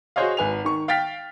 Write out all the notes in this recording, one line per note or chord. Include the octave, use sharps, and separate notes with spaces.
F#4 G#4 C5 C#5 D#5 F5
G#1 B4 G#5 F7
D#3 C#6
F5 G5 F6 A6 B6